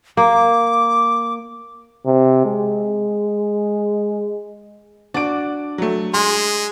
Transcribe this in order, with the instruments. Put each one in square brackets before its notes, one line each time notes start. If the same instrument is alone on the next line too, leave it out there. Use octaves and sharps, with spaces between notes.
[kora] A#3 [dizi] D6
[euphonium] C3
G#3
[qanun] D4 F#4 [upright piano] D5 D7
[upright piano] F#3 A3
[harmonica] G#3 [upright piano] C6